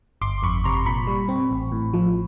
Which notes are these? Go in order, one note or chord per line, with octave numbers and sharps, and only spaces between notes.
G1 C6 D6
F2 B5 C#6
C3 A#5 C6
A#2 B5 C#6
G3
C4
A1
A2
F3